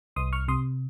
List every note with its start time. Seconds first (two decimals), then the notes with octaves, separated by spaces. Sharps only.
0.16 C2 C6 D#6
0.33 C#6 F6
0.48 C3 C6 D#6